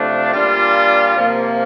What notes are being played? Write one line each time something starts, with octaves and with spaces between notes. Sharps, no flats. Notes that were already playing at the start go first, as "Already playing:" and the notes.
Already playing: C3 F3 A3 D4
A#2 G3 D4 F4
C3 F3 A#3